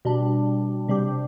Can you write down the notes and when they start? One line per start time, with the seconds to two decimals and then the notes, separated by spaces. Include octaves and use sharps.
0.05 B2 G3 D4
0.88 C3 G3 D4 G4